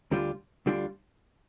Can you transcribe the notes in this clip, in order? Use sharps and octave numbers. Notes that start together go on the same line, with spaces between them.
D2 D3 G3 D4 F4
D2 D3 G3 D4 F4